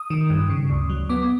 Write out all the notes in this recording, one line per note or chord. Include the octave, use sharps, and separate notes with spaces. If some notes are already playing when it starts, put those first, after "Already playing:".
Already playing: D#6
D#3
G2
C#3
D2
F#3
B3 D6